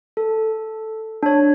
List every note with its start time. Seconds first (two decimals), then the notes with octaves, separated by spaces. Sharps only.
0.17 A4
1.23 D4 C#5